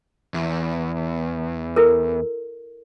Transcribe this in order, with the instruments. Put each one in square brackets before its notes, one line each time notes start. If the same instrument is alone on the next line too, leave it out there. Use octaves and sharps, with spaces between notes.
[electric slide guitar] E2
[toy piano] E4 A4 A#4